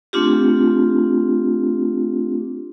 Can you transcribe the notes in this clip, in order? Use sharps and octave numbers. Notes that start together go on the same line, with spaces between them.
A3 C4 D4 F4 G4